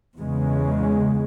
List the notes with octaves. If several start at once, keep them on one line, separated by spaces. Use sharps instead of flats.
E2 C#3 G#3